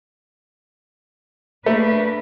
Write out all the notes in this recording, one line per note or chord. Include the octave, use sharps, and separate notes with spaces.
A3 A#3 D4 B4